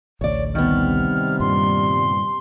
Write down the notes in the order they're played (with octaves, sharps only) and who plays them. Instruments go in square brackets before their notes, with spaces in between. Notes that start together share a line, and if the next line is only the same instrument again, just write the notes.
[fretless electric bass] A1 D2 [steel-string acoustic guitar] C#5 D5
[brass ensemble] C3 G3 [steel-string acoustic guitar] D#3 B3 [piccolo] F6
[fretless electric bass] G2 A#2 [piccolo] C6